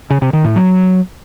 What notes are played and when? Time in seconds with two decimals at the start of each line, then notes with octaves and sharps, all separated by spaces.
0.10 C#3
0.22 C3
0.33 D#3
0.45 A2
0.56 F#3